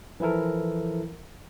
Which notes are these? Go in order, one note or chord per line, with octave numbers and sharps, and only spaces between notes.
E3 F3 E4 A4 A#4